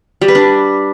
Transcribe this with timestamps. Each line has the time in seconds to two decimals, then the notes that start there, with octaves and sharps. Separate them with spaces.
0.22 G3
0.28 B4
0.35 D4